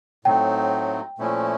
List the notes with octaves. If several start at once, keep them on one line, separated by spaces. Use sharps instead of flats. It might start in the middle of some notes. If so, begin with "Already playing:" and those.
A2 F#3 A3 C4 D#4 G5
A#2 F3 A3 C#4 E4